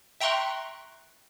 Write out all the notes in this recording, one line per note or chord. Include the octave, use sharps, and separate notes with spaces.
E5 G5 A#5 C6 C#6 F#6